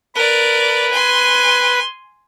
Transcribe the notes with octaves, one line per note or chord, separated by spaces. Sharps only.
A#4 B4 D5
G#5 C6